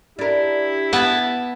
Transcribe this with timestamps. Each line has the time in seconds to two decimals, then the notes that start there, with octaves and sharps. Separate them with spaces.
0.19 D4 E4 G4 A#4
0.93 B3 E5 A5